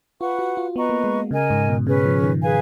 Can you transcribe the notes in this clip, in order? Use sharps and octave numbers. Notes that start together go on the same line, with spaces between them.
F4 B4 F#5 C#6
F#4
F4
B3 B4 D#5 A#5 C#6
A#3
G#3
C#3 A#4 D#5 G#5
G#2
B2
C#3 C#4 G#4 B4
F3
D#3
G#4 B4 F5 G#5